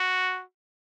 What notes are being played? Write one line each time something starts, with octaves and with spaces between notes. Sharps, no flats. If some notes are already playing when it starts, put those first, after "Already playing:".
Already playing: F#4